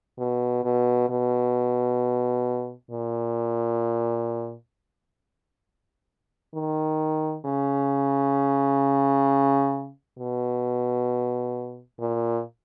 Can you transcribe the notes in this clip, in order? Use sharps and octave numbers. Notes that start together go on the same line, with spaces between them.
B2
B2
B2
A#2
D#3
C#3
B2
A#2